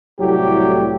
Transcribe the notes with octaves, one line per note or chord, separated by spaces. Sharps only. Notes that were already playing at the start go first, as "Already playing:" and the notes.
C2 A2 F#3 G3 A3 G4